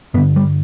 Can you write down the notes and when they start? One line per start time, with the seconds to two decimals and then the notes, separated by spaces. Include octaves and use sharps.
0.14 G2 B3
0.18 D3
0.36 G3